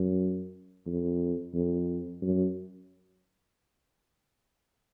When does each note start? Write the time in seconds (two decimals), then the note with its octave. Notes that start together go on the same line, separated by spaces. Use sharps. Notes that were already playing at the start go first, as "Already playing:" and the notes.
Already playing: F#2
0.86 F2
1.54 F2
2.22 F#2